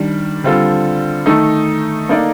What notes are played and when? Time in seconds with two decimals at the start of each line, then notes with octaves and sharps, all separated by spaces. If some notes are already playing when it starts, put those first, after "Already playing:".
Already playing: D#3 G3 D4
0.44 D3 G3 C4 F4 A4
1.26 D#3 A3 D#4 A4
2.09 A#3 D#4 A4 D5